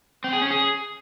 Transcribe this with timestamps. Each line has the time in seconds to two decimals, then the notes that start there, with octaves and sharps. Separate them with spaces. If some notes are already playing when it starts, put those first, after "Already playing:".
0.24 C4
0.33 G#4
0.42 C#4
0.50 G#4